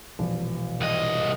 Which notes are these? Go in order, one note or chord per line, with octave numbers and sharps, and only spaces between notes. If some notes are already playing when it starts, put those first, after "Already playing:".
E1 A#1
C2 D#5